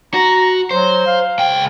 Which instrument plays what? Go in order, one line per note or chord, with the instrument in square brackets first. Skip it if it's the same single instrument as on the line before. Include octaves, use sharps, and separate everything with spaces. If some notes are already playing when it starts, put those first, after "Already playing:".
[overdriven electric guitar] F#4 [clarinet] A#5
[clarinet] F#3 [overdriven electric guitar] C5
[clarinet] F5
[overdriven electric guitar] C#2 G5